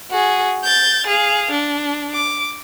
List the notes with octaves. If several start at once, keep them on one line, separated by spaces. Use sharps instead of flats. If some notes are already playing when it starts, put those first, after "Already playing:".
F#4 G#4
G6 A6
G#4 F5
D4
D6